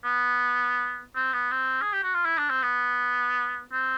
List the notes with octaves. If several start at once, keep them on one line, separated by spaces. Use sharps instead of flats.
B3
C4
B3
C4
G#4
G4
F#4
F4
E4
D4
C4
B3
C4